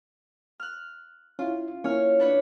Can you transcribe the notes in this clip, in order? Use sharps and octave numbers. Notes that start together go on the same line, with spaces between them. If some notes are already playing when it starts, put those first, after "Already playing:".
F6 F#6
C#4 E4 F4
A#3 C#4 E4 C#5 F6
D4 B4 C#5